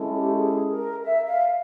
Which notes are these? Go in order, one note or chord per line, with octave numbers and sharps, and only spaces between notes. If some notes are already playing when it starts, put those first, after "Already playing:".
Already playing: G#3 C#4 E4 A4
G4
G#4
A#4
E5
F5